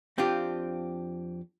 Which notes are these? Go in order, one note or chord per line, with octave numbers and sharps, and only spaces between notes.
F2 C4 D4 F4 G4